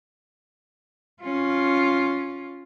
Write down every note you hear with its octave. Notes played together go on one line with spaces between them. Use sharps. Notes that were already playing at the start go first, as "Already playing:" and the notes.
C#4 F4